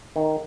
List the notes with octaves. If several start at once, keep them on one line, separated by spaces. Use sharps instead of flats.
D#3